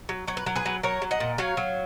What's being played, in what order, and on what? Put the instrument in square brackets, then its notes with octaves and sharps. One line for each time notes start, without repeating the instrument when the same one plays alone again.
[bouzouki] F#3
F#3 C#5
B4
F#3 A#4
G#4 B4
F#3
F#3 A#4 C#5
F#3
D#5 F#5
A#2
F#3 C#5 F5
F#3